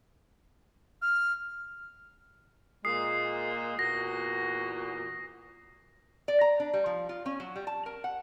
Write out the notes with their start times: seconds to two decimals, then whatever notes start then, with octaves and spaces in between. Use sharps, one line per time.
1.02 F6
2.85 A#2 G#3 D#6 C7
3.79 E2 A#2 F#4 A#6
6.28 D5
6.41 A#5
6.60 D4
6.73 G3
6.86 F3
7.09 F4
7.26 C#4
7.40 F#3
7.56 G3
7.67 A5
7.86 A#4
8.04 F#5